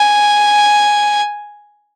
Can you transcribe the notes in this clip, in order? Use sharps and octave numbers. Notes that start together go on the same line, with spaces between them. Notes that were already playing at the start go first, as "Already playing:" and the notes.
Already playing: G#5